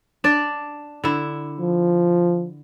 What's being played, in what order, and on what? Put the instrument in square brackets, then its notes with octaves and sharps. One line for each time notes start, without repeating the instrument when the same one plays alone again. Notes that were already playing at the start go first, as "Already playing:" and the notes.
[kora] D4 D5
D3 E4
[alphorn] F3